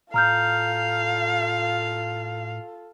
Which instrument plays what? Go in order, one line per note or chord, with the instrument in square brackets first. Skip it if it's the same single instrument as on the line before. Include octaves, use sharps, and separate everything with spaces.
[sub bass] A2 [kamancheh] F4 A4 [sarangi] F5 [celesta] A#5 F6 G6